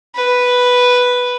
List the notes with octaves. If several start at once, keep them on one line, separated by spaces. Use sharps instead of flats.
B4